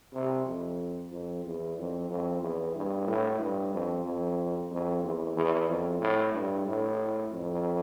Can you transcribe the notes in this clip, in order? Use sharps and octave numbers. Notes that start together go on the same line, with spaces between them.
C3
F2
F2
E2
F2
F2
E2
G2
A2
G2
F2
F2
F2
E2
E2
F2
A2
G2
A2
F2